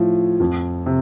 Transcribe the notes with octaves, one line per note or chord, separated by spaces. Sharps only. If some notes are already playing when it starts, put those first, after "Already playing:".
Already playing: A2 F3
F2
C3